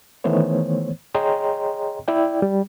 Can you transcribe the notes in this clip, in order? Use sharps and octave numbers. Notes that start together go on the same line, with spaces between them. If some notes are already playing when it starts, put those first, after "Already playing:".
D#3 E3 A3 B3 C5 C#5
G#4 C#5 D#5 G5 A#5 C6
E4 D5 G5
G3